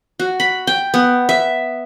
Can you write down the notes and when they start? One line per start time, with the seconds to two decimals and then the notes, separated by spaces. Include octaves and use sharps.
0.20 F#4
0.40 B5
0.67 G5
0.94 B3
1.29 E5